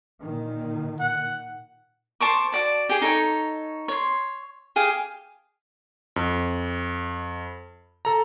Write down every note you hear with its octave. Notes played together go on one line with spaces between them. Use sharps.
A#2 D#3
F#5
C5 A5 C#6 D6
F#4 D5 A5
G4 G#4
D#4 A4 C#5
C#5 C6
G4 G#4 F5
F2
A4 A#5